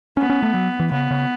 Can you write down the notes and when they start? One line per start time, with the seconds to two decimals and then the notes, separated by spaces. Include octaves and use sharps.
0.17 B3 C#4
0.30 C#4
0.42 A3
0.54 F#3
0.80 E3
0.91 C#3 B3
1.11 C#3